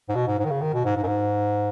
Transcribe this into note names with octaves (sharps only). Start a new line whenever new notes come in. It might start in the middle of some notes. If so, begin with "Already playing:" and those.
G#2
B2
G#2
G#2
D#3
C#3
D#3
B2
G#2
G#2
F#2
G#2